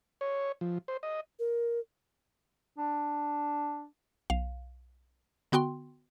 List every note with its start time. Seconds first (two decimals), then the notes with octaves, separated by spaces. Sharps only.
0.21 C#5
0.61 F3
0.88 C5
1.03 D#5
1.39 A#4
2.78 D4
4.30 B1 F5
5.52 D3 B3 F#4 G5 C6